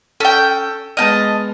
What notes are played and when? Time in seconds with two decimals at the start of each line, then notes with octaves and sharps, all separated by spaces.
0.20 C#4 A4 G5
0.97 G#3 B3 D#5 G5 A5 F6